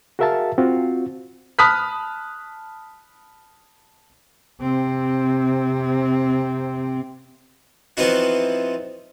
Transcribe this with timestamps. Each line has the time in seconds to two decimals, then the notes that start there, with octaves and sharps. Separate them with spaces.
0.19 F#4 G#4 A#4 E5 F5 A5
0.58 C4 F4 F#4
1.59 A5 B5 D#6 F6 F#6 B6
4.61 C3 C4
7.97 E3 F3 B3 C4 D#4 F#4